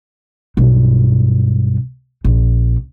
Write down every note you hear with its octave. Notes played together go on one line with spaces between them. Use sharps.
B1 G2
A#1